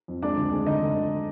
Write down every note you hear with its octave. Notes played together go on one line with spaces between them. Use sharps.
F2
G#3 D4 D5
D2
G#3
D3 D#4 D#5
D3
D2